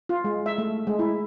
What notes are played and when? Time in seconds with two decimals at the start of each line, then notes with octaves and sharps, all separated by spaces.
0.09 F4
0.24 G#3
0.46 E5
0.58 A3
0.87 G#3
0.99 E4